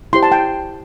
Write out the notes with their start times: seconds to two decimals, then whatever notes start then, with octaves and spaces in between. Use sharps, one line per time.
0.13 E4 G4 C5 C6
0.23 A5
0.32 G5